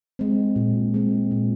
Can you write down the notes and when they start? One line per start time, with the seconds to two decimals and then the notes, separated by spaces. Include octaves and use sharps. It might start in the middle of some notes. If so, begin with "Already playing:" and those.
0.19 G#3 C4
0.56 A#2
0.94 G#3 C4
1.31 A#2